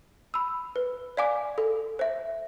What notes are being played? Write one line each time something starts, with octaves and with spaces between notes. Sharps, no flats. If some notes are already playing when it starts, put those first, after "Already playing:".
B5 E6
B4
D5 F5 G#5 D6
A4
C5 E5